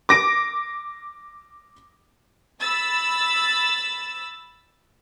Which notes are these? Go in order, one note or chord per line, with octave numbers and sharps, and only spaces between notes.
D6 A#6 D7
B5 E6 A6